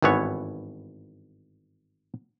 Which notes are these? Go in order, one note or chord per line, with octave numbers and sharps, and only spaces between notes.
G#1 G2 E3 B3 C#5